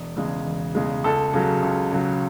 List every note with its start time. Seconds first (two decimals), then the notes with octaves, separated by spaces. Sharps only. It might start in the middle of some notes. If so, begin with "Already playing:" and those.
Already playing: E1
0.17 E2 C#3 G#3
0.46 E1
0.75 E2 C#3 G#3
1.04 C#2 A4
1.34 C#3 F#3
1.63 C#2
1.92 C#3 F#3